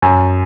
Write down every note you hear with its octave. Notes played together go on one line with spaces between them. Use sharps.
F#2